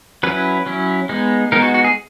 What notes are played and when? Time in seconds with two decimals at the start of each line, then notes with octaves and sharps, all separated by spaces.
0.23 F#3 C#4 E4 B4
0.66 F#3 C#4 E4
1.09 G#3 B3 D#4
1.52 G#3 B3 D#4 A#4
1.62 F#4
1.74 F#4
1.84 G#4